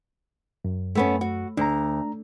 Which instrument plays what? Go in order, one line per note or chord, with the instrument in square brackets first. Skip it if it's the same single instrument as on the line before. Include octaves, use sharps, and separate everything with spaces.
[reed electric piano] F#2
[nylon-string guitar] A3 B3 C#4
F#4
[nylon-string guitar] D2 [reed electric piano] D4 A#5